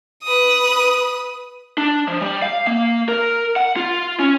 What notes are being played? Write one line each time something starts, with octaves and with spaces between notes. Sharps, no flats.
B4 D#6
D4
F3
G3
F5
A#3
A#4
F#5
F4
C#4